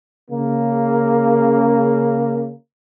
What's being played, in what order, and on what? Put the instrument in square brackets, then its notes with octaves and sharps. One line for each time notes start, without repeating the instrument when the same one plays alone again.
[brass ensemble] C#3 A#3